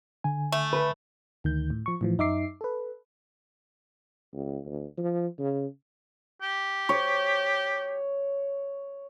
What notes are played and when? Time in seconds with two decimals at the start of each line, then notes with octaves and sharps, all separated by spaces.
0.24 D3 G#5
0.52 A3
0.73 B4
1.44 D2 D#3 G6
1.70 A2
1.86 F3 C#6
2.01 A2 E3 F3
2.18 F#2 D#4 E5 D6 C7
2.61 A4 B4
4.33 C#2
4.65 D2
4.98 F3
5.39 C#3
6.42 G4
6.89 C#5